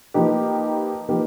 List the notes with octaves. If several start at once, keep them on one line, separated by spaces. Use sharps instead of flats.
F3 A#3 D#4 G4 B4
F3 A#3 D#4 G4 B4